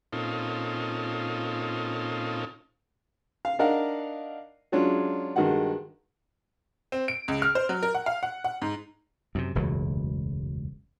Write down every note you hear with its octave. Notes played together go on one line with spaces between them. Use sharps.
A#2 C4 C#4 D#4 F4 A4
F5
D4 D#4 A#4 D#5 F5 F#5
F#3 G#3 C#4 D4 F4
G2 D#3 G#3 F#4 F#5
C4
D7
C#2
F6
C5
F#3
A#4
F#5
F5
F#5
F#5
G#2
F#2 A2 C3
E1 C#2 F#2 A2